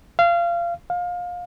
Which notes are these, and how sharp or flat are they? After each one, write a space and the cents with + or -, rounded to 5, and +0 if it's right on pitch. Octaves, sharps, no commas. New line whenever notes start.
F5 -25
F5 +25